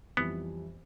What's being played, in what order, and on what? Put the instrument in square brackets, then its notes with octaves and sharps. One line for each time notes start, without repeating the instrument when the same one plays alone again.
[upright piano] F2 E3 G3 [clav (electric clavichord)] B3